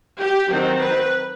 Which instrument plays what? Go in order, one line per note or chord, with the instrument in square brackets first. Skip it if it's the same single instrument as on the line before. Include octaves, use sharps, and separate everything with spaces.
[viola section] G4
D#3 F#3 C4 D#4
B4